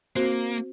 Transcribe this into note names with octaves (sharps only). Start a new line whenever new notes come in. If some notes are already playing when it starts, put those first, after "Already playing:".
A#3 C4 F#4 C5